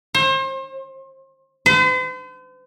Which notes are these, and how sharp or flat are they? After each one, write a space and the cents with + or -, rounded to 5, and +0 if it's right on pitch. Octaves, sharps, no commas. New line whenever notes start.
C5 +35
C5 -45